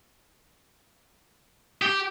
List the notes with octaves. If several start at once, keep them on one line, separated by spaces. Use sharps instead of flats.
G4